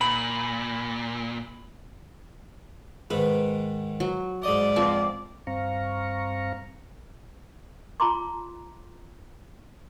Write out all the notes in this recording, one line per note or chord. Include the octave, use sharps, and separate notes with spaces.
A#2 B5 F#7
G#2 D#3 B4
F#3
G#2 D5 D#5
F3 C4
G2 C4 F5 A#5 C#6
F4 A5 A#5 C6 D6